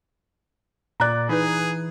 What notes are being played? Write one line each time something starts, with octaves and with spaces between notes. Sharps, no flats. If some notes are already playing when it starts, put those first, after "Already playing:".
A#2 D5 A#5 F#6
E3 D#4 G#4 B4